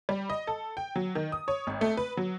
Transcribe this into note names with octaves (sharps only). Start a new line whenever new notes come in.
G3
D#5
A4
G5
F#3
D#3
D#6
C#5
G#1
A3
B4
F#3